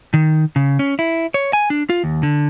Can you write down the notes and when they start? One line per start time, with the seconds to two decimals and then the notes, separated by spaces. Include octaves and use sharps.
0.14 D#3
0.56 C#3
0.79 C#4
0.99 E4
1.34 C#5
1.53 G#5
1.70 D4
1.90 F4
2.04 D#2
2.23 D3